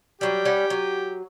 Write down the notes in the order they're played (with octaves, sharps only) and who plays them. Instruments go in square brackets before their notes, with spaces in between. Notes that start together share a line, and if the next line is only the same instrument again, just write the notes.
[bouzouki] F#3 G3 [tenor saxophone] G4
[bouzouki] G3 C#4 F#5
F#3